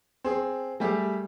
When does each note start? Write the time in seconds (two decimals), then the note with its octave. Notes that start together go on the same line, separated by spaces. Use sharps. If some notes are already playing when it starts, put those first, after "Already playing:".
0.24 C4 G#4
0.80 G3 A3 G4 G#4